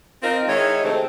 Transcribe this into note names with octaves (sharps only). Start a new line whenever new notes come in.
C4 D#4 F4 A#4
D#3 G#3 D#4 E4 C#5
C3 G#3 A3 C4